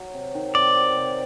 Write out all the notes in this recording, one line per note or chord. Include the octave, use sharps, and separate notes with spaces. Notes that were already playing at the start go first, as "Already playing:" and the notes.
Already playing: F#3
C3
D#3
C3 D5
F#3
C3